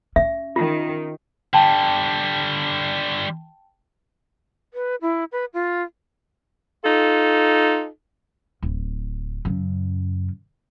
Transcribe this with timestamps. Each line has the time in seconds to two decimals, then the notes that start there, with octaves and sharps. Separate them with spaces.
0.16 C#4 E5
0.56 D#3 F4
1.53 D3 G3 G5 A5
4.74 B4
5.01 E4
5.32 B4
5.54 F4
6.84 D#4 F4 A4
8.62 D1
9.45 F#2 C#3